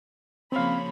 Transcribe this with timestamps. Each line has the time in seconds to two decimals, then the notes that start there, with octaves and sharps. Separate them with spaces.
0.52 C#3 F3 A#3 C4 C#5 F5 B5